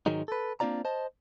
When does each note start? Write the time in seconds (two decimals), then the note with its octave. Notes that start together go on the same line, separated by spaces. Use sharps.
0.06 G#2 D#3 F#3 G#3 D#4
0.28 A4 B4
0.60 A#3 C4 D4 F4 D5 A#5
0.85 C5 D#5 A5